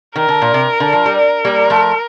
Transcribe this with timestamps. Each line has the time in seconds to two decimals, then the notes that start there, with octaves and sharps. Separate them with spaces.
0.15 D#3 A#4
0.28 D3
0.42 A#2
0.54 C3
0.80 D3
0.93 F3
1.06 G3
1.18 A#4
1.45 G3 A#3
1.70 F3 A3